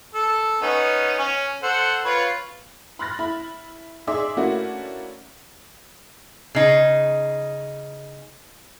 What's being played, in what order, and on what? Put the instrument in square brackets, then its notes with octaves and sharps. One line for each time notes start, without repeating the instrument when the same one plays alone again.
[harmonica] A4
B3 C#4 D#4
C#4
A4 C5 F#5
F4 B4 C#5
[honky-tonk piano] B5 C6 F6 F#6 A6 A#6
E4 B5
D#4 G#4 D5 E5 C6 D6
A3 A#3 C#4 D4 E4 F#4
[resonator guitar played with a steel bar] C#3 D#4